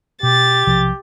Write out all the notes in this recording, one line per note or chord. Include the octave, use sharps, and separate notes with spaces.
B2 G4 A6
B1 C3 F3